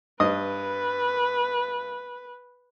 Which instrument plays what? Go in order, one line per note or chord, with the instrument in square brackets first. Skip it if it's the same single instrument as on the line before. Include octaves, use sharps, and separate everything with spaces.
[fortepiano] G2 D#5 D#6 [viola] B4